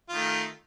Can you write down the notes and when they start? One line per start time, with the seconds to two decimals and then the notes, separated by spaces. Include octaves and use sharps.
0.09 F4
0.13 D#3
0.16 A3